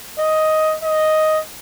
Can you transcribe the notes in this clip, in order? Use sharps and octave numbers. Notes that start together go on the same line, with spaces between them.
D#5
D#5